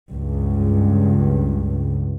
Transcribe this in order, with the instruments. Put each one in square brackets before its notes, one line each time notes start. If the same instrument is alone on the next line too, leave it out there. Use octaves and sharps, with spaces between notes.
[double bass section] C#2 G2